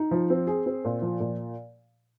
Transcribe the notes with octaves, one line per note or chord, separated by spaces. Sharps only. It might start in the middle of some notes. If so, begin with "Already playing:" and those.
Already playing: D#4
F3
C4
G#4
C4
A#2
F3
A#2